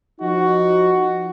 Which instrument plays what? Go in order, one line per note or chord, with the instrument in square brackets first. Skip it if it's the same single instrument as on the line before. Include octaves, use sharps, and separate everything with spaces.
[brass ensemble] F3 D#4 F#4